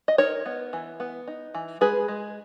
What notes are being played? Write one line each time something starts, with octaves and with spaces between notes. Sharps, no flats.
D#5
D#4 A#4 C#5
B3
E3
B3
D#4
E3
G#3 G#4 B4
G#3